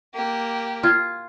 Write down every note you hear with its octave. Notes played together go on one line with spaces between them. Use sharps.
A#3 G4
F4 F6 G#6